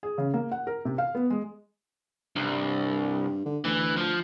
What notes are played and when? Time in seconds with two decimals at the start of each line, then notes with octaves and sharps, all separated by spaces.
0.03 G#4
0.18 C#3
0.34 A#3
0.51 F#5
0.67 A#4
0.85 C3
0.98 F5
1.15 B3
1.30 G#3
2.36 C2 G2
3.45 D3
3.64 D2 E3
3.97 F3